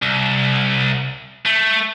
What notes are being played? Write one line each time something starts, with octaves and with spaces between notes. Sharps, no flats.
C2
A3